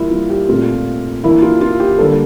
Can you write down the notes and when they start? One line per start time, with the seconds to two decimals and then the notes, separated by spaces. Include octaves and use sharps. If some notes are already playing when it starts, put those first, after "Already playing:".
Already playing: E3 G3 A#3 E4 F4
0.11 F4
0.30 G4
0.49 A#2 A3 C4 F4
1.24 E3 A#3 D4 E4
1.42 F4
1.61 F4
1.80 G4
1.99 D3 G3 A#3 D4 A4